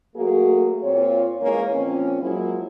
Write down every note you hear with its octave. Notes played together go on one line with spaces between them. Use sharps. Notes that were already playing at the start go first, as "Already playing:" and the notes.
F#3 A3 A#3 F#4 G#4
A#2 C4 F4 C#5
E3 G#3 A#3 C#4
A#2 F3 C4 C#4
F3 F#3 G#3 A#3 E4